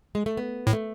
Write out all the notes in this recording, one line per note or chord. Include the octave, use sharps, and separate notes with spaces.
G#3
A3
B3
A2
A3